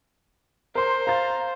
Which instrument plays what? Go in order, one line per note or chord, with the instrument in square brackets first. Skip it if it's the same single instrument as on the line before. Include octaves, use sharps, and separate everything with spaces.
[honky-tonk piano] A#4 C6 [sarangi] C5
[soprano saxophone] F5 [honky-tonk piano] A#5 A6